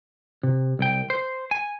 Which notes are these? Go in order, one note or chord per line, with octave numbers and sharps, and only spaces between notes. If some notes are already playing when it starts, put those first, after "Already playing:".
C3
C2 G5
C5
G#5